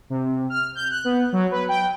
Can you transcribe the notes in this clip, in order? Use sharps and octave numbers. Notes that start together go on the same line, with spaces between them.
C3
F6
G6
F#6
B3
F#3
B4
G5